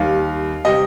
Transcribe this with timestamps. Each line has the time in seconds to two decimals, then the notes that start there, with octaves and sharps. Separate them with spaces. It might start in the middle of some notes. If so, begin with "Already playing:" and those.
Already playing: D#2 D#3 G3 F5
0.65 C3 G3 D#5 G5